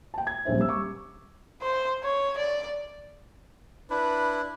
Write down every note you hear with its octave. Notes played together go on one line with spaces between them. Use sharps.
G5 A5
G#6
D#1 A#1 D4 C5 E5
G3 E6
C#6 D6
C5
C#5
D5
D4 E4 B4